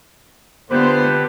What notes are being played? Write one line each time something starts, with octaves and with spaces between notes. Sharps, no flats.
D3 B3 D4 F4 G4 B4 C5